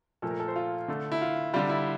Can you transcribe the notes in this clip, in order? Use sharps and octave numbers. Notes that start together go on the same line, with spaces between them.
A#2 F3 A3 A4
A#4
A4
C5
F4
D3 A3
E4
F4
D3 G3 F4
E4